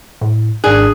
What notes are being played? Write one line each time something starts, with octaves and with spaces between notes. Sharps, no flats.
A2
G#1 D#3 D4 G#4 F#6